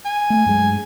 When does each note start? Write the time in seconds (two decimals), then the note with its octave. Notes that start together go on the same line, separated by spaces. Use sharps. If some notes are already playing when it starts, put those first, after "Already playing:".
0.05 G#5
0.30 A3
0.46 G2 F#3 G#3